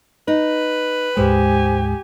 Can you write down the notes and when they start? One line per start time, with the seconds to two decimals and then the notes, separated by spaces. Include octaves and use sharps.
0.28 D#4 B4
1.17 D2 G#2 G#3 G4 C5 G#5